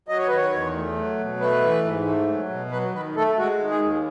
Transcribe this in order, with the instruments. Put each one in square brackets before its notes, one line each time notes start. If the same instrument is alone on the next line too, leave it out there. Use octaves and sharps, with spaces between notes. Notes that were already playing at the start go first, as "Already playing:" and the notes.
[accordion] F#3 D#5
C#5
D#3 B4
C#5
E2
A3
F#3
B2
A3 B4
E3
G#2
A3
F#3
B2
F#3 B4
D#3 B4
A3 A4
G#3 F#4
D#3
G#4
D#2